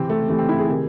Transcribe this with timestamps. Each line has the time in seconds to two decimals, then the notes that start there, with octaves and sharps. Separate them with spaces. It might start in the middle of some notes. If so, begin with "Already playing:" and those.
Already playing: C3 E3 C4
0.09 A3
0.28 C3 E3 A3
0.39 C4
0.49 E4
0.59 G#4
0.69 C3 D#3